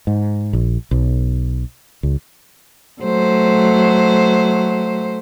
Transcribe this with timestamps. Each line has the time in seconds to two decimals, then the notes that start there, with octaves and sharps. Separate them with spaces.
0.07 G#2
0.53 A#1
0.91 B1
2.03 C#2
3.02 F#3 A3 C5